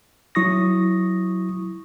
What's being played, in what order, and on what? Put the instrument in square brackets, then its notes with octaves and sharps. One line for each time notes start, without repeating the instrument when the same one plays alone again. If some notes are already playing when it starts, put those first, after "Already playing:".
[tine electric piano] F#3 E4 C#6 D#6 A#6